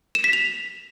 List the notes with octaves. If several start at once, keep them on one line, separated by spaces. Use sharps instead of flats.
E7
B6
F7